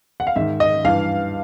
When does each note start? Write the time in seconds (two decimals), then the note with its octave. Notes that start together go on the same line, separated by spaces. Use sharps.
0.20 F#5
0.27 F5
0.36 G#2 D#3 E5
0.60 D#5
0.85 G2 E3 F5